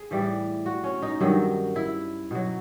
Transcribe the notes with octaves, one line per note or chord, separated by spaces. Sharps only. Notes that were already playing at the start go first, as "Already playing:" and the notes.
Already playing: G#4
A2 E3 G3
F#4
C#4
D#4
G2 D#3 F#3
E4
B2 F#3